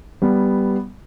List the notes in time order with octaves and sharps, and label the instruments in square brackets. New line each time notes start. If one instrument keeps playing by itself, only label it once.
[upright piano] G3 B3